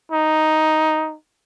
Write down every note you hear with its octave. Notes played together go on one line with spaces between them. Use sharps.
D#4